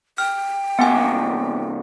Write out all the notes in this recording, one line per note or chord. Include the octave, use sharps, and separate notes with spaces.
G5 F6
C2 A#3 B3 F#5 G#5